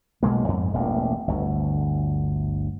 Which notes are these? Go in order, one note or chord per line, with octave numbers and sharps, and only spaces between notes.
B1 B2 G#3 A#3
F2 G#2
E1 A1 A#3
G1 D2